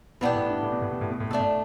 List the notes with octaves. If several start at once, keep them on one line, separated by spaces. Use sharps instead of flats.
B2 E3 B3 D4 G4
A2
G2
A2
B2
A2
B2
A2
B2
A2
B2 A3 D4 A4
A2